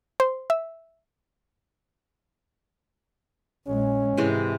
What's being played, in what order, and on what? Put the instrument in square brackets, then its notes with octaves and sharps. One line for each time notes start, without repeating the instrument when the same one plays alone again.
[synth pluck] C5
E5
[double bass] A#1 G#3 [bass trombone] C#4
[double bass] G#2 [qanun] C3 E3 G#3